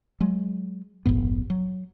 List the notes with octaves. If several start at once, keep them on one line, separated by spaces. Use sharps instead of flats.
F#3 G#3
F1 A#1 G#2 B3
F#3